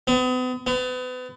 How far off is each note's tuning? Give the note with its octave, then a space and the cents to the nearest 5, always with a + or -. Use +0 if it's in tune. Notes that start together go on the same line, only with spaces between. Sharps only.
B3 +40
B3 +35